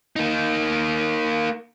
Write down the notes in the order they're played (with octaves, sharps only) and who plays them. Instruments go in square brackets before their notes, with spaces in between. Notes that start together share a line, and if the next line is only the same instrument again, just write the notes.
[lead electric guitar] A#3 D#4